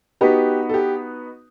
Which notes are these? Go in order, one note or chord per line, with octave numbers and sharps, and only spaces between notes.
B3 D#4 F#4 G4 B4 D#5
A4
G4